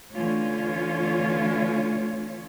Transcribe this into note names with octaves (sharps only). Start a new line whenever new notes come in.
D3 E3 A3 C#4 F4 C#5